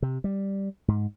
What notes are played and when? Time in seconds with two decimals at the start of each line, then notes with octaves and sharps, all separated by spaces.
0.02 C3
0.24 G3
0.88 G#2